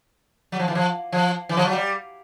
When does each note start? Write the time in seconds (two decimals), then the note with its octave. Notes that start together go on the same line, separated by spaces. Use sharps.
0.52 F#3
0.59 F3
0.68 E3
0.75 F3
1.12 F3
1.49 E3
1.57 F3
1.65 F#3
1.73 G3